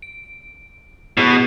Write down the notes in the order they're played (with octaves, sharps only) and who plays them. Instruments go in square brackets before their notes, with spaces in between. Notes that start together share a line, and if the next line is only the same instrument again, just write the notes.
[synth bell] D7
[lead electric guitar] B2 [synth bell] B3 E4